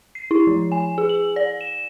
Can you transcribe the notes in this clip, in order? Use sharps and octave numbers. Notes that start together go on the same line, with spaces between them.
C7
E4
F3
G#5
G#4
F#7
D5
E7